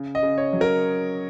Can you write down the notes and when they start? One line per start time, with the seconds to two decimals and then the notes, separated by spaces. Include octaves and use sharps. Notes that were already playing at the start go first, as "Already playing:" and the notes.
Already playing: C#3
0.15 D#5
0.23 C#3
0.38 C#5
0.53 F#3
0.61 A#4